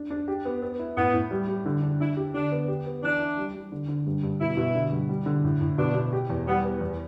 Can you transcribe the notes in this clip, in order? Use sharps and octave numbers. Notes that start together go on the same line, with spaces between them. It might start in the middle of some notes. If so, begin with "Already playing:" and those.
Already playing: D4
D4
G4
B3
B3
E4
A2 B3
A2
G3
G3
D3
D4
D4 E4
G4
D3 D4
B3
G4
B3
E3 D4
E4
G3
G3
D3
D3
G2
G2
B2 E4
B2
D3
G2
G3
D3
A2
A2
B2 D4
B2
G4
E2
G3 B3
B3
E2